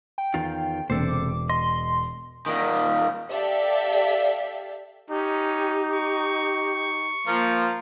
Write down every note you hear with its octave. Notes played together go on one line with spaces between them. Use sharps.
G5
E2 D#3 F4
E1 C3 A4 C5 D6
D#5 C6
A#2 D#3
G4 A4 D5 E5 F5
C#4 D#4 G4
C#6
F3 A#3 F4 A#4